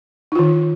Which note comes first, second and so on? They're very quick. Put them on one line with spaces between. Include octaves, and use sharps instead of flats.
D#4 F4 D#3